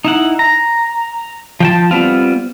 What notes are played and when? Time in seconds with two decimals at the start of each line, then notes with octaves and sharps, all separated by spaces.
0.05 D#4 E4 F#5
0.39 A#5
1.60 F3 G5 A5
1.91 G3 B3 C4 F4